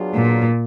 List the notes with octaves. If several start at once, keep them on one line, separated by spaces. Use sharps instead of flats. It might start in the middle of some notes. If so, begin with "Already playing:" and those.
Already playing: F#3 B3 D4 F4 G#4
A#2